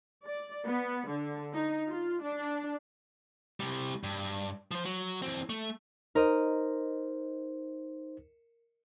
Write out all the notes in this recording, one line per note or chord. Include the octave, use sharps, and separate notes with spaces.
D5
B3
D3
D#4
F4
D4
C3 G3
G2
F3 C5
F#3
E3 C4
A3
D#4 A#4 C5 D#5